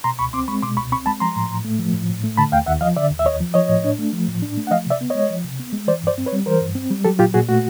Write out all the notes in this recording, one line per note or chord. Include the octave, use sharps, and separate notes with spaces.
B2 A#5 C6
C#2 B5 C#6
C4 C6 D6
G#3 B5 C#6
B2 C6 D6
C#2 B5 C#6
C4 B5 C#6
G#3 A5 B5
F3 A#5 C6
A2
A2
A3
F3
A2
A2
A3
D3 A5 B5
D#2 F5 G5
D#2 E5 F#5
F3 D#5 F5
D3 D5 E5
D#2
E5
D#2 C#5 D#5
F3
F3 C#5 D#5
A2
D4
A3
F3
A2
D4
A3
F#5
F3 D#5 F5
C3 D5 E5
B3
G#3 C#5 D#5
F3
C3
B3
G#3
E3 C5 D5
G2 C5 D5
C4
B4 C#5
G3
E3 A#4 C5
G2
C4
G3
F#3 G4 A4
A#2 F4 G4
A#2 F#4 G#4
A3 F#4